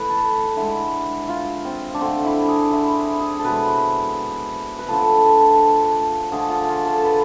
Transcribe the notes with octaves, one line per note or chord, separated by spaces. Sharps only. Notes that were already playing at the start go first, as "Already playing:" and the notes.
Already playing: A2 E3 A3 B4
A4
D3 G#3 E4
F4
C4
D4
D3 A3 C4
E4
G#4
E4
G#4
A4
B2 G#3 B4
B4
D3 F3 A3 A4
D3 F3 A3 G#4
F4
F4
A4
B4